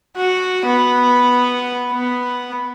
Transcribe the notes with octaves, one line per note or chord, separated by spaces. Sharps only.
F#4
B3
B3